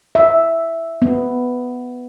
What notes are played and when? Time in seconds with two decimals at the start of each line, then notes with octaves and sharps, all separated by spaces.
0.15 E5
1.02 B3